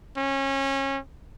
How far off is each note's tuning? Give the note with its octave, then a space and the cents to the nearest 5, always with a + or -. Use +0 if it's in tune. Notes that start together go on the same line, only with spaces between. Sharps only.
C#4 -25